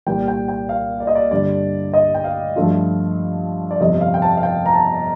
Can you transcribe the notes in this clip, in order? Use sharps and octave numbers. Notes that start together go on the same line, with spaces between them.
C2 A#2 G3 G5
G5
G5
F5
D5
D#5
D5
G2 D3 G3 D4 D5
D#5
G5
F5
G2 F3 A3 D4 F4
D5
G1 F2 C3 D#5
F5
G5
A5
F5
G5
A#5
A5